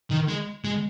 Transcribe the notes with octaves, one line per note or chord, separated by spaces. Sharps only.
D#3
G#3
G#3